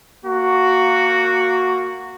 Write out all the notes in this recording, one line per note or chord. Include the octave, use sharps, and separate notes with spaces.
A#3 F#4